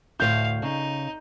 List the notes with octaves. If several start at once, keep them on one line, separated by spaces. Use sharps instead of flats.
D2 A2 C5 F5 G6
C#3 D#4